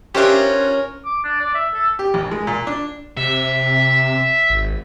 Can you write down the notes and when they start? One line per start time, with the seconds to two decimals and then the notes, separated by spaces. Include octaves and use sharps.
0.15 C#4 D4 F4 G4 A#4 C5 E5
1.05 D6
1.24 D4
1.40 D5
1.55 E5
1.74 A4
1.99 G4
2.14 A#1
2.31 G#3
2.47 A#2
2.67 D4
3.17 C3 E5
4.50 G#1